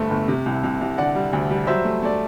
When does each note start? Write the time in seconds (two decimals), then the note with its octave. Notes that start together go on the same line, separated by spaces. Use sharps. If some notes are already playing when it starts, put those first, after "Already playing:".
Already playing: G1 G2 A3 C5 E5
0.10 G1
0.28 C3
0.46 C2
0.63 C2
0.81 C2
0.98 D3 D5 F#5
1.15 G3
1.33 D2
1.50 G3
1.67 F#3 C5 E5
1.84 A3
2.02 A3 D5